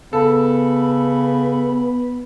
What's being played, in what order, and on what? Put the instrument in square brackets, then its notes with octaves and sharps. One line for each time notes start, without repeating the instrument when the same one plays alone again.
[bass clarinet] C#3 [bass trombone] B3 [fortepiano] A4 [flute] B5